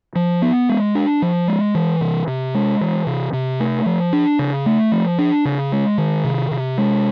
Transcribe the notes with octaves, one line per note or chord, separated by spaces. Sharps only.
F3
B3
G#3
D4
F3
G#3
E3
C3
C3
G#3
E3
C3
C3
A3
F3
D4
C#3
A3
F3
D4
C#3
G#3
D#3
C3
C3
G#3